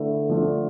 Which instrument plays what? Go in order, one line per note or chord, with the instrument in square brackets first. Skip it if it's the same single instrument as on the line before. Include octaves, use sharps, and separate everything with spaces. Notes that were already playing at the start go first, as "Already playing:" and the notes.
Already playing: [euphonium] D3 [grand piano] A3 E4 B4
[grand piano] F3 A3 D4 F4